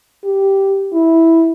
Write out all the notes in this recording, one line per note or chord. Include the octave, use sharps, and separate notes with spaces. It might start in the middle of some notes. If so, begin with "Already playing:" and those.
G4
E4